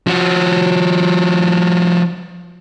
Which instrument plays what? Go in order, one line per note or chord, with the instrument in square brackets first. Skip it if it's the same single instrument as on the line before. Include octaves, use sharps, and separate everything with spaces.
[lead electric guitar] F3 F#4